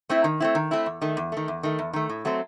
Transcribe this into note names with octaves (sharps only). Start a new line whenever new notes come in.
A3 C4 E4
D#3
A3 C4 E4
D#3
A3 C4 E4
E2
D#3 A3
E2
D#3 A3
E2
D#3 A3
E2
D#3 A3
A2
F#3 A3 C4